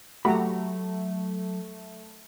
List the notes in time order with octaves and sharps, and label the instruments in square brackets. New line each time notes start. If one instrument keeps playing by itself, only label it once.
[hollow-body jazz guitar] F#3 B5 [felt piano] A3 [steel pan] F#4 G4 A#5